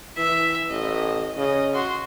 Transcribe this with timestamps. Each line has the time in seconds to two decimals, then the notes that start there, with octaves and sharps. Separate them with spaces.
0.17 E3 E5
0.70 A1 D#5
1.37 C#3 D#5
1.74 F#4 C6